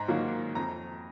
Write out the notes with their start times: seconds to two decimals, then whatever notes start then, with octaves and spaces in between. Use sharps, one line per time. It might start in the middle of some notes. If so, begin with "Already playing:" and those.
Already playing: G#2 A#5
0.08 D#3 F#3 A#3
0.55 F2 A#5